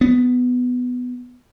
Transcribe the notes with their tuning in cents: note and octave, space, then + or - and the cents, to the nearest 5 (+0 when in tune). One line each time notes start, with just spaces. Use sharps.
B3 +10